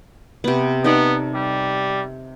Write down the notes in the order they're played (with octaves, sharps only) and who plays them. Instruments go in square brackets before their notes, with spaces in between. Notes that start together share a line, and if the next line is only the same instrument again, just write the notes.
[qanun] C3 B3
[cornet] B3 [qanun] D#4 A4 D5
[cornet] G3